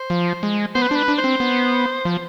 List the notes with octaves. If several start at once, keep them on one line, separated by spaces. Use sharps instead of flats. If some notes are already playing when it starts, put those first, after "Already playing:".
Already playing: C5
F3
G#3
B3 C5
B4
D4 C5
B4
D4
C5
C4
B3
F3